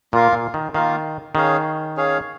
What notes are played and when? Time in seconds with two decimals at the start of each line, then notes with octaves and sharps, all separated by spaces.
0.13 A#2 A#3 F4 A#4 F5
0.33 A#2
0.54 D#3
0.74 D#3 A#3 F4 A#4 F5
1.35 D#3 C#4 G#4 C#5 F5
1.96 C#4 G#4 C#5 F5